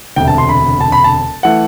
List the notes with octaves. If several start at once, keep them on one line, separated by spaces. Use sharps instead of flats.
E1 D2 C3 G5
A5
C6
B5
A5
B5
A5
E3 A3 F#5